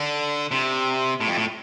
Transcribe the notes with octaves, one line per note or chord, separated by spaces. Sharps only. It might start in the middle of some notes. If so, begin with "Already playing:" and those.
Already playing: D3
C3
A2
F2
A2